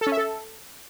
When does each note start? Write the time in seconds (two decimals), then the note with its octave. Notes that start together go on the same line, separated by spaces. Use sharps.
0.01 A4
0.07 C#4
0.12 E5
0.17 A4